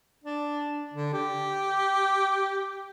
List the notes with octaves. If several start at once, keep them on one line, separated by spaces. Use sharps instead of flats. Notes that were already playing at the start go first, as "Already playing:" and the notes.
D4
D3
G4